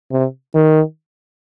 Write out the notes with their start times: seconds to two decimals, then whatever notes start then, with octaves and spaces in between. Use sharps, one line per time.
0.11 C3
0.55 D#3